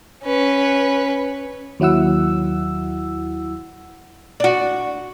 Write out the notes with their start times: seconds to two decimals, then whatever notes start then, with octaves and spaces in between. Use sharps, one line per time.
0.23 C#4 B4
1.80 D#2 F#3 E4 F#5 E6
4.40 D4 F#4